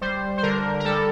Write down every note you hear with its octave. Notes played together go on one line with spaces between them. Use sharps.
G3 C5
C5
D3 A#4
A#4
G3 A4